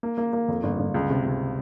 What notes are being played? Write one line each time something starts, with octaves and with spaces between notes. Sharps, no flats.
A#3
A#3
A#3
F2
G1
G1
C#2
C3
C#2